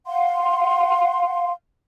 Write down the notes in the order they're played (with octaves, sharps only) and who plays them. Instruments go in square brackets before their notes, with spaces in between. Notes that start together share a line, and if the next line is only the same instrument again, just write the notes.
[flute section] F5 F#5 C6